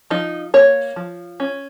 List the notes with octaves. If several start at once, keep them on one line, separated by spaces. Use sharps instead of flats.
F3 D#4
A#3 C#5
F3
C#4